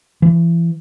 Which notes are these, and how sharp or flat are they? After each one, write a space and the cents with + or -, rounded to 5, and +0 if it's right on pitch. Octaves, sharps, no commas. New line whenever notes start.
E3 +35